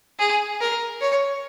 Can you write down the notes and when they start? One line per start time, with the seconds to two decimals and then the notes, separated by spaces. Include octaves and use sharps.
0.19 G#4
0.61 A#4
1.01 C#5